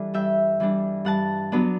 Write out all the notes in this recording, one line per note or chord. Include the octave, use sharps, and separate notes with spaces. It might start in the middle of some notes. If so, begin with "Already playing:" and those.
Already playing: E3 G3 D4 A4
G2 E5 G5
E3 G3 D4
G2 F#5 A5
F#3 B3 D4